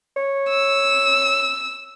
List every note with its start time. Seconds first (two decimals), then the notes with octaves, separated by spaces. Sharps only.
0.16 C#5
0.49 E6